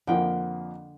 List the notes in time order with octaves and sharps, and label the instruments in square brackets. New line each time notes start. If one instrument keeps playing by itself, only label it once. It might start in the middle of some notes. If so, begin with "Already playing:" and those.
[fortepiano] F2 F3 A#3 [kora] D3 G5